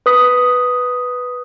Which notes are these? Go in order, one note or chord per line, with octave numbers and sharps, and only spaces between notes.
B4 D#6 B6